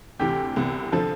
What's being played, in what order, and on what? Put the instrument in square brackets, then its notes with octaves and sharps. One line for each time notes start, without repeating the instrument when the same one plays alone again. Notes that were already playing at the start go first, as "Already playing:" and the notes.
[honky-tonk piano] D2 C3 E3 [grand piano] G4
[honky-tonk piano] C2 C3 E3 B3
[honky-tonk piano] D3 F3 [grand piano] A4